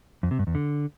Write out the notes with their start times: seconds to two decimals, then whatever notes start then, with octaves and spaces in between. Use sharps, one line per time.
0.23 F2
0.31 C3
0.39 G2
0.47 E2
0.55 D3